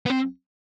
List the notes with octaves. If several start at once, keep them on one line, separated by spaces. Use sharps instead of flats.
B3
C4